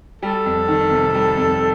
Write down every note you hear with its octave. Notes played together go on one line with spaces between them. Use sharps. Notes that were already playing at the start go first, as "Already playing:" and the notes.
G3 A4
F2
D#3
C3
G3
F2